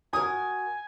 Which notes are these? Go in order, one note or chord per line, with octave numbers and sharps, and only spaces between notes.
F#4 A#4 G#5 D#6